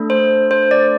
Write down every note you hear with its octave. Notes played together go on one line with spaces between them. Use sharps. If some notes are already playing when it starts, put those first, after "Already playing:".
Already playing: A3 D4 A4
C5
C5
D5